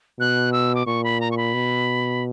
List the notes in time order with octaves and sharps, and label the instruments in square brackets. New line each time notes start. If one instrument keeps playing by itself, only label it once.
[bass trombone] B2 [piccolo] F#6
[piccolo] E6
D6
[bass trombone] A#2 [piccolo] C#6
[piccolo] B5
A#5
C#6
B5
[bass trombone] B2